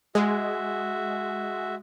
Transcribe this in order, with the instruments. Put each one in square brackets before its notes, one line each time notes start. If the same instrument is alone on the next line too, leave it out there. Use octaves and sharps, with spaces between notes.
[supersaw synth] G#3 [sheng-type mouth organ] F#4 E5